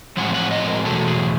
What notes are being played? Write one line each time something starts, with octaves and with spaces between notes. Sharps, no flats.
A2 F3 G#3 C4 F#5
F#5
D#5
A#4
E2 B2 F#3 A3 A4
G#4